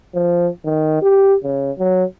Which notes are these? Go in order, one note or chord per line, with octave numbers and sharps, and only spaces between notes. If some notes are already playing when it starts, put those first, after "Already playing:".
F3
D#3
G4
C#3
F#3